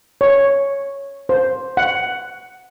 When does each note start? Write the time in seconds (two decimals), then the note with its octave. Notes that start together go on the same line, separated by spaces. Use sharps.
0.21 C#5
1.29 C5
1.77 F#5